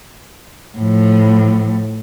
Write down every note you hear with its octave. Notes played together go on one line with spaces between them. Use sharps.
A2 F3